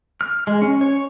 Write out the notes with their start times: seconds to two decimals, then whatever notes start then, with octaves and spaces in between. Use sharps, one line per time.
0.21 F6
0.47 G#3
0.62 C#4
0.81 C#5